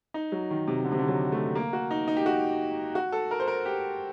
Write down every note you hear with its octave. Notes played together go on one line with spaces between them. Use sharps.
D#4
F#3
D#3
C3
D3
C3
D3
F#3
A3
A#3
F#4
D#4
D#4
G4
F#4
F#4
A4
A#4
C5
A#4
G4